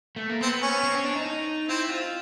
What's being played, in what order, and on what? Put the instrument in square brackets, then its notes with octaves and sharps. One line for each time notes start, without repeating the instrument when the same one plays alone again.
[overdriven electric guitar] A3
A#3
[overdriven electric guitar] B3 [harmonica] C4
[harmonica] C#4
[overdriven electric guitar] C4
C#4
D4
D#4
D#4
[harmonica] C4 [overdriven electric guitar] E4
[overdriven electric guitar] F4